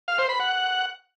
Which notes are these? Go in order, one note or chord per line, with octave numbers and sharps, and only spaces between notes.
F5
C5
B5
F#5